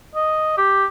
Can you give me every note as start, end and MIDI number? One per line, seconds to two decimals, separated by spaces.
0.15 0.57 75
0.58 0.85 67